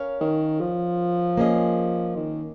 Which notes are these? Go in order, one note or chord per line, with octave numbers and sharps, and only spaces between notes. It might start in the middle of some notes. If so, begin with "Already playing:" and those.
Already playing: C#4 A#4 C#5 F5
D#3
F3
A#3 C#4 G#4 D#5
D#3